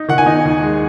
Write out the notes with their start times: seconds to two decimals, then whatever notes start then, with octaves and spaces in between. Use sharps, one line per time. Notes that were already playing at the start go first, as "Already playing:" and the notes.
Already playing: D#4
0.09 D#3 F#5
0.18 G#5
0.26 D#4
0.45 D#2
0.63 G#3